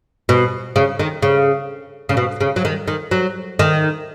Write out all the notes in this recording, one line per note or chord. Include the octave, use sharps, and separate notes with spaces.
B2
C#3
D#3
C#3
C#3
B2
C#3
F#3
D#3
D#3
F#3
D#3